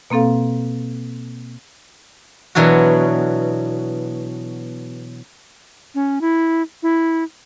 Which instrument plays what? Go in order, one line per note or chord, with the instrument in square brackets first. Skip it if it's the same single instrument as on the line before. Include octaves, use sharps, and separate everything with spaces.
[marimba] B2 A#3 C4 A4 F5
[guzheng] B2 E3 F#3 D4 F#4
[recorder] C#4
E4
E4